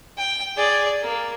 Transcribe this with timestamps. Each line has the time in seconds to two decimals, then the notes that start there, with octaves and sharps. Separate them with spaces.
0.18 G5
0.57 G#4 D5
1.02 A#3